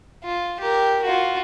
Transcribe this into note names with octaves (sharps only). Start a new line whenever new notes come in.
F4
G4 A#4
F4 F#4